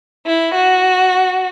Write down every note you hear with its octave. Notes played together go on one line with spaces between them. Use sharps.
E4
F#4